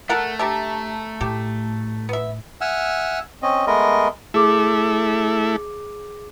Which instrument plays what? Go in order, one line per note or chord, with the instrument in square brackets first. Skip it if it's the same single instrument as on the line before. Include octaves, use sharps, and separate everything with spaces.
[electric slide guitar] A3 [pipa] A4 A#4 F#5
[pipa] D4 G4 E5 [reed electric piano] A5 A#5
[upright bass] A2 [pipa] G4 A4
[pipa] B3 E5
[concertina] E5 F#5 G#5 E6 F6
C4 C#4 D#5
G#3 A3 B3 A#4 D#5
[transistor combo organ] A3 E4 [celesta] G#4 D6